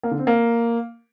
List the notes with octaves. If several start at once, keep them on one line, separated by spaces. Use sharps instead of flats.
A#3
D3
C4
A#3